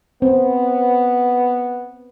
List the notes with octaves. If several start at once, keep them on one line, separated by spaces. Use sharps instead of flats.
B3 C4